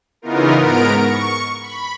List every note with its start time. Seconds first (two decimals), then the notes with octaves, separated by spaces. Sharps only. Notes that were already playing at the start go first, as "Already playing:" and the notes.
0.22 C#3 E3 B3 D#4 F4 A#4
0.57 G#2 B3 A#4 A#5 D7
0.97 C#6
1.61 B5